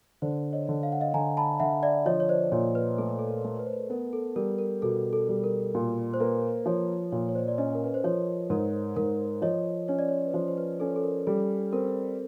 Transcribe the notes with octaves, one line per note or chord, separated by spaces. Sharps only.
D3 C5 D5
C#5 D#5
D3
F5
F#5
D#5 F5
D3 G#5 A#5
A5 B5
D3 E5 F#5
D5 E5
F3 C#5 D#5
C#5
C5 D5
A#2 C#5
B4
A3 A4
A4
A#4
A3
B4
C5
B4
B3 A#4
A4
G3 A#4
A#4
B2 A4
A4
G3
A#4
A#2
C5
A#3 B4
F3 C#5
C#5
A#2 C#5
C#5
C5 D5
D5
C#4 C#5 D#5
A#4
B4
C5
F3 C#5
G#2 A#4
G#2 A#4
F3 C#5 D#5
C#4 C#5
D5
C#5
B4
F3 C5
C5
B4
C#4 A4
A4
A#4
G3 A4
C4 A#4